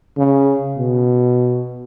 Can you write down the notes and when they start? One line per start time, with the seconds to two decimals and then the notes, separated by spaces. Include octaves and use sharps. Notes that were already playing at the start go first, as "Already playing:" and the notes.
0.18 C#3
0.78 B2